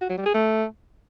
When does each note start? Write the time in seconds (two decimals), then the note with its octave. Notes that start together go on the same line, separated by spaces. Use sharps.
0.01 F#4
0.10 F#3
0.18 G3
0.26 G#4
0.34 A3